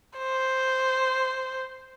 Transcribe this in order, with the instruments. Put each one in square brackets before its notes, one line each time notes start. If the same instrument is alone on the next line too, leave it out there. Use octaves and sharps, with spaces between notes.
[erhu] C5